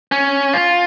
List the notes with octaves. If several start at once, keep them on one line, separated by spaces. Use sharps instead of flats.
C#4
F4